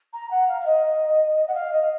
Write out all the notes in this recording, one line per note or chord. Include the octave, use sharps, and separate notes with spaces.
A#5
F#5
F5
F5
D#5
F#5
F5
D#5